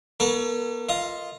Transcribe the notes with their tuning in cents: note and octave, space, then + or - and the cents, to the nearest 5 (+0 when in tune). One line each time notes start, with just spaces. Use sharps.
B3 -40 A4 +45 C#5 +25
F4 +0 D#5 +15